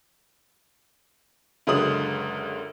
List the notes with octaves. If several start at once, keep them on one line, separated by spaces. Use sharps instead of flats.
C#2 F#2 D3 G#3 D#6 F#7